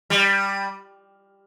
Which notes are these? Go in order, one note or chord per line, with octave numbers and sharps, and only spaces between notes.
G3